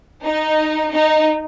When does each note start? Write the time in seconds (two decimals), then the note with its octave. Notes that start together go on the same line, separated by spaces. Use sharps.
0.25 D#4
0.93 D#4